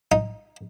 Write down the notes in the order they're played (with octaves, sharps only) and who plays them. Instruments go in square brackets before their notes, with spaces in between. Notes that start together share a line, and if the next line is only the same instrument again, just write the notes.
[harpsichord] D#4